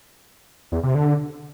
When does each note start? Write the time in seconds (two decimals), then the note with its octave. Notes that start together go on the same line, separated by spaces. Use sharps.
0.72 E2
0.83 C3
0.95 D3